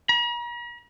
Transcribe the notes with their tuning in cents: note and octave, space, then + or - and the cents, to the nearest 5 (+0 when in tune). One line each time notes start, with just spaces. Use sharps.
A#5 +45